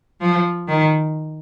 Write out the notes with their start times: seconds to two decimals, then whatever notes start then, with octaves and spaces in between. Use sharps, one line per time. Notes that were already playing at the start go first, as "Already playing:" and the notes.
0.21 F3
0.68 D#3